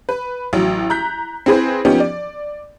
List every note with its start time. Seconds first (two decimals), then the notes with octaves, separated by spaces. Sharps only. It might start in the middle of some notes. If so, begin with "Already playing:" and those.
0.09 B4
0.53 A1 F#3
0.90 A#5 F#6 G6 B6
1.46 C4 E4 G#4 B4 C5
1.85 F3 B3 C#4 D#4 G4
2.00 D5